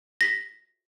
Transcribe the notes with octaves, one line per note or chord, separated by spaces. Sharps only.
A#6 B6